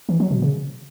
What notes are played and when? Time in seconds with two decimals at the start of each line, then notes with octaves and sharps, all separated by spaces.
0.09 E3
0.20 F#3
0.31 B2
0.42 C#3